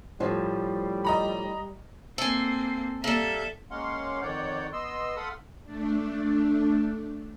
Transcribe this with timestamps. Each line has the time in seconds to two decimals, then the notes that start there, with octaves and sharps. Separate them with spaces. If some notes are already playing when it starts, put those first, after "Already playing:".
0.20 A2 F3 G3
1.05 D#5 A#5 B5
2.18 A#3 C4 A4 G#5
3.04 G3 A#3 A4 E5
3.71 G#3 A#3 C#4 F5 F#5 C6
4.22 F2 D#3 C#5 D5 F#5 G6
4.73 B3 D#5 C6 E6
5.17 A4 F5 F#5 B5 C6 D#6
5.63 A3 D4